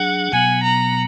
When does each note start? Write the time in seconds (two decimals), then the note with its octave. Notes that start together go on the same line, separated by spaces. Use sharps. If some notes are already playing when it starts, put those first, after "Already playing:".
Already playing: F#3 D4 G#4 F#5
0.32 B2 F#3 B3 G#5
0.64 A#5